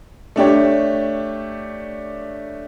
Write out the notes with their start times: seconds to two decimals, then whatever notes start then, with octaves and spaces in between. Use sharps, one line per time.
0.36 A3 D4 G4 C#5